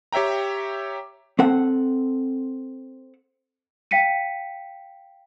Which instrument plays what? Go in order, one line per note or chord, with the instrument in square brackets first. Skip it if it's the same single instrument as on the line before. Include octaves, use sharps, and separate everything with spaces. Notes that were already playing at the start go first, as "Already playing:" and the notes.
[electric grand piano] G4 C#5 E5 G5 A#5
[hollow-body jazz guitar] C4 A4 F#5
[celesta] F5 G5 B6 C#7 D#7